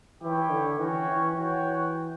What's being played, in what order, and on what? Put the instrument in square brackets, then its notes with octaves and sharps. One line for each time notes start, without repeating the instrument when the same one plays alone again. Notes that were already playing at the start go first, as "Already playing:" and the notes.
[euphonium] E3 [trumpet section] E4 G4 C#5 G5
[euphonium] D3
[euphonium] E3 [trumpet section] C#4 F#4 C#5 G5
[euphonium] E3
[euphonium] E3 [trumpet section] F#4 C#5 G5